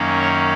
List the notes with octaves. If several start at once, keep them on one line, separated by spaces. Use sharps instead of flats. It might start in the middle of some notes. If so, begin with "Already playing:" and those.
Already playing: F#2 D#3 A#3 C#4
C#5